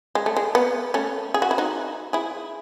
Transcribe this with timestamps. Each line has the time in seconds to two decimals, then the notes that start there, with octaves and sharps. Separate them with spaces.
0.15 G#3
0.26 A3
0.36 G#3
0.55 B3
0.94 A3 C#4
1.34 G#4
1.42 F#4
1.51 E4
1.58 D#4 F#4
2.13 E4 G#4